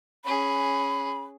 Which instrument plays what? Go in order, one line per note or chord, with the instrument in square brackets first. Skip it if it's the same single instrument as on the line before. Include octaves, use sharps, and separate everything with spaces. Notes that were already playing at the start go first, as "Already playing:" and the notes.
[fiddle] C#4 G#4 [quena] B5